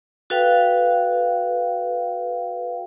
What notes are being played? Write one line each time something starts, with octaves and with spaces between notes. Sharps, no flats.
F#4 A4 B4 F5 G5